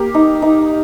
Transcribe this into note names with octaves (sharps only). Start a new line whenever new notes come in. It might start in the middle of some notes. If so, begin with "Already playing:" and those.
Already playing: A#3 G4
D#4
D#4